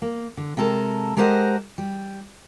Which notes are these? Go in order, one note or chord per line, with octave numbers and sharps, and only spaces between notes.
A#3
D3
C3 G#3 A4 A#4
G#3 G4 A#4 C5 D#5 F#5
G3